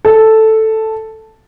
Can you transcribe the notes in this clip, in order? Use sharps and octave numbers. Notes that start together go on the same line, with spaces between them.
A4